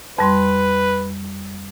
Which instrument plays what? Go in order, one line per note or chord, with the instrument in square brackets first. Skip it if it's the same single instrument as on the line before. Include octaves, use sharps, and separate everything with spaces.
[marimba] F2 G3 C6 [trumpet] B4